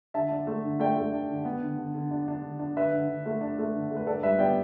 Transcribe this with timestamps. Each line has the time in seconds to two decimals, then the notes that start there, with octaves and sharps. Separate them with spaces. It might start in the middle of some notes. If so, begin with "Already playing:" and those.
0.14 D3 E5 A5
0.31 D4
0.47 A3
0.64 D3
0.80 A3 D5 G5
0.97 A3
1.12 D4
1.29 D3
1.45 B3
1.62 D3
1.78 D3
1.94 D3
2.11 D4
2.28 D4
2.43 D3
2.59 D4
2.76 D3 B4 E5
2.93 D3
3.09 D3
3.26 A3
3.41 D4
3.59 A3
3.74 D3
3.90 A3
3.97 B4
4.07 G2 A4 D5
4.23 G3 B4 E5
4.39 B3 D5 G5